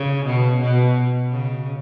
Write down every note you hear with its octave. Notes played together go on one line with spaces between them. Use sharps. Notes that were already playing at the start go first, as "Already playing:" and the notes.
Already playing: C#3
B2
B2
C#3